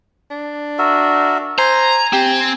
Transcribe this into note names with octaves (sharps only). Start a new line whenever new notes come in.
D4
F#4 A#4 E5
C5 G#5 A#5
C4 G4